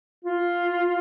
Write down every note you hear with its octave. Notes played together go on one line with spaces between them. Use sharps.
F4